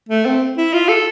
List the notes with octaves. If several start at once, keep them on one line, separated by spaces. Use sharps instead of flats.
A3
C4
E4
F4
A4